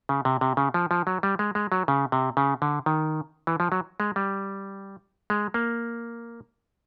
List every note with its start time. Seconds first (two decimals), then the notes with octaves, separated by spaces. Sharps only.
0.09 C#3
0.25 C3
0.41 C3
0.57 C#3
0.74 F3
0.91 F3
1.07 F#3
1.23 G3
1.39 G#3
1.55 G#3
1.72 F#3
1.88 C#3
2.12 C3
2.37 C#3
2.62 D3
2.86 D#3
3.47 E3
3.60 F3
3.72 F#3
4.00 G#3
4.16 G3
5.30 G#3
5.54 A#3